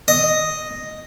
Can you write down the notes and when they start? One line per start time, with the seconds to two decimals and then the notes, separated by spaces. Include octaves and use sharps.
0.08 D#5